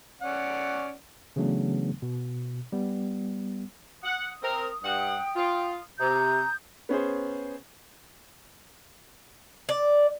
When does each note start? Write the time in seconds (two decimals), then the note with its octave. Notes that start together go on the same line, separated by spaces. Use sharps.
0.22 C#4 D5 F#5
1.36 C#3 E3 F#3 A3 B3 D4
2.02 B2
2.72 G3 B3
4.04 F#5 D#6
4.42 C4 A#4
4.84 G2 F#5 G5
5.35 F4
6.00 C3 A#5 D#6 G6
6.89 B3 C#4 G#4 C5
9.69 D5